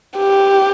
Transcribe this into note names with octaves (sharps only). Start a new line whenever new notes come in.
G4